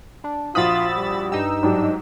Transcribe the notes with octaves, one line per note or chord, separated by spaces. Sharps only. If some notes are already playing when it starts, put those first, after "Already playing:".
D4
A#1 F4 F#4 B5 D#6 E6 A6
G3
G2 D#4 G4 E6
G#2 F#3 D4 G4